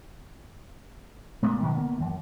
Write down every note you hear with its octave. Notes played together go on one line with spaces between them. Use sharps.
A#2 G#3 A3 B3
B2 D#3 F#3
D3 A#3 B3
F#2 E3